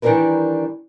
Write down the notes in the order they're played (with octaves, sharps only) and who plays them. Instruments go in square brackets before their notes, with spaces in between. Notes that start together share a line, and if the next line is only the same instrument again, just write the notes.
[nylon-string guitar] D#3 E3 G3 D4 A#4 B4